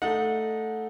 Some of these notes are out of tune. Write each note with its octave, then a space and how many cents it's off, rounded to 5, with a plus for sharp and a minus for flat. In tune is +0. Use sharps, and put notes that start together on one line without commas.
A3 +0 D#4 +0 F#5 -25